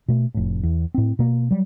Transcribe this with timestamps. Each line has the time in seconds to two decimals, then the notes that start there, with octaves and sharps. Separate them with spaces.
0.08 B2 A3
0.34 F1 A2
0.63 E2
0.94 A2 C4
1.19 B2 A#3
1.51 F#3 G3